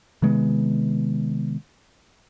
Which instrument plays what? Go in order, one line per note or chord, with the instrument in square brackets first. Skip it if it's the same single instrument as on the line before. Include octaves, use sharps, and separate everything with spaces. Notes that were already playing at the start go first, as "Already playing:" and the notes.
[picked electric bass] C3 D#3 G#3 B3